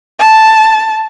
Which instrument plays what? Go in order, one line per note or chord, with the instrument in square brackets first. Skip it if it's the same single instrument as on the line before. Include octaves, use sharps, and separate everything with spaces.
[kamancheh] A5